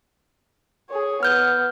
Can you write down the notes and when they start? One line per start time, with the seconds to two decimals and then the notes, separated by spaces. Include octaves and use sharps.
0.90 G#4 C#5
1.23 B3 F6 G6